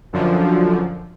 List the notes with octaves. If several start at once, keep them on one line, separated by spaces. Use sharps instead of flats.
F#2 D3 F3